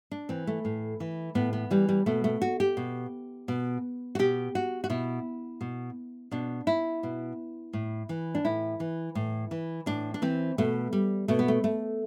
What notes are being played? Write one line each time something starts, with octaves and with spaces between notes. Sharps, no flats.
D4
E3 C4
A3
A2
E3
A2 B3
B3
E3 G3
G3
B2 A3
A3
F#4
G4
B2
B2
F#4
B2 G4
F#4
F#4
B2 E4
B2
B2 D4
E4
B2
A2
E3
D4
A2 E4
E3
A2
E3
A2 D4
D4
E3 C4
B2 A3
G3
B2 A3
B3
A3
A3